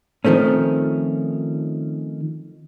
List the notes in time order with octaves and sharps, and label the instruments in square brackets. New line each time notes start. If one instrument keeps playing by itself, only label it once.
[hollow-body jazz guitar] D#3 F3 A3 C4 C#4